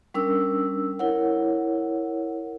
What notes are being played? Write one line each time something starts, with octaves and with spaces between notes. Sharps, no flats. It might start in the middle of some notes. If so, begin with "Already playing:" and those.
G3 C#4 D4 A#4 E6
E4 A#4 C#5 F#5